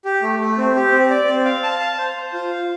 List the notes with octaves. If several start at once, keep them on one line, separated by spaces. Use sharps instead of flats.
G4
A3
A3
C4
G4
C4
D5
C4
F5
A5
F5
C5
C5
F4
F5